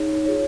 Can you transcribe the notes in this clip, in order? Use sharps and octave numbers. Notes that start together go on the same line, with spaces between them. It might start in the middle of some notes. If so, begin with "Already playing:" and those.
Already playing: D#4 G#4 C#5
F4 G#4 C#5